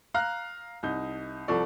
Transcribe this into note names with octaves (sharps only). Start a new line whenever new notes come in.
F5 A#5 F6 F#6
C2 D#4 G6
C2 F3 A4 D5 C#6